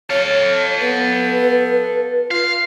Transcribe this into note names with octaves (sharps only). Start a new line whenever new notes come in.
A4 C#5 F5
B3 B4
F4 F5